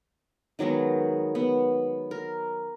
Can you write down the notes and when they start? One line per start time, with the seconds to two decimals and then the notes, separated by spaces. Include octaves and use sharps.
0.59 D#3 F#3 G#3 B3
1.35 B3
2.11 A#4